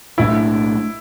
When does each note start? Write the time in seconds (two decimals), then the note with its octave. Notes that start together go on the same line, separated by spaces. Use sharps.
0.17 B1 A2 A3 D4 E4